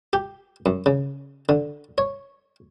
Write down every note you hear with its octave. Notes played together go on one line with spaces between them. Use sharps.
G4
F#2
C#3
D3
C#5